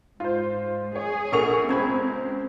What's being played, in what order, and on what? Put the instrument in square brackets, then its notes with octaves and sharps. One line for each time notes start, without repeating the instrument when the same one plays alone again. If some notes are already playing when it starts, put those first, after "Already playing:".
[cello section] G#2 [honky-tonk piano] F4 C5
[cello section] G#4 [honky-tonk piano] C#5
[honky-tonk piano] A#1 C#6 F7 [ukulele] A4 A#4 F#5
[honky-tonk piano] C#2 G#6 [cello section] C4 [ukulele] C#4 C5 B5